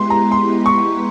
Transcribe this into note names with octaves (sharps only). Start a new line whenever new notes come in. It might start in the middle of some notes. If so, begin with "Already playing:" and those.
Already playing: G#3 B3 E4 G4 B4 C6
A#5
C6
C#6